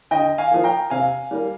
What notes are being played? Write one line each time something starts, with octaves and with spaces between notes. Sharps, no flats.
D3 D#5 G5
F5 G#5
F3 A#3
G5 A#5
C3 F5 G#5
G3 A#3